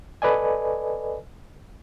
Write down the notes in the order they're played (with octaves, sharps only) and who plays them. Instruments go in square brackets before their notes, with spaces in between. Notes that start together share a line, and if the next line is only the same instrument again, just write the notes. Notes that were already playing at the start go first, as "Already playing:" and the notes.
[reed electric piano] A4 B4 D5 D#5 G#5